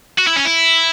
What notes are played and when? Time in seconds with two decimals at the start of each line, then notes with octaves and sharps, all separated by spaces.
0.18 F#4
0.27 E4
0.36 C#4
0.45 E4